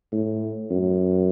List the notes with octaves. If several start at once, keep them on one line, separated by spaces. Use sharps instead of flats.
A2
F#2